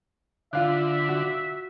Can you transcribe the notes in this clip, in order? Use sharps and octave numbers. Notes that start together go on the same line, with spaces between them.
D3 F4 E5 F5 F#6
F#4